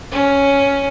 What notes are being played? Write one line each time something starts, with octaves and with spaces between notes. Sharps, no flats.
C#4